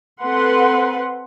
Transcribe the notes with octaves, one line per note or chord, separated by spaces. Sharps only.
C4 A4 B4 F#5 C6